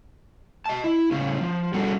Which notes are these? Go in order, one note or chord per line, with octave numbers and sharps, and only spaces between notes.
D#5 A5
E4
A2 C#3 C#4
F3
G3 C#4 F#4 G#4 A4